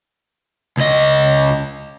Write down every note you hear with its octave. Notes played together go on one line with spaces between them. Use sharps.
C#2 D#5